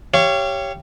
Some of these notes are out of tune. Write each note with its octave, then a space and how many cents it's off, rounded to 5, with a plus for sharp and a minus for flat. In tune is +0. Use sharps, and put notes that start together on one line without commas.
G4 +0 C#5 +0 F5 -35